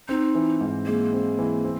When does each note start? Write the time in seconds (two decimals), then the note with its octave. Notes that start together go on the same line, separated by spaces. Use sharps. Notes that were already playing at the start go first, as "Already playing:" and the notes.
0.08 C4 D#4
0.35 E3
0.61 G#2
0.86 G#3 A#3
1.13 C4
1.39 E3
1.65 C4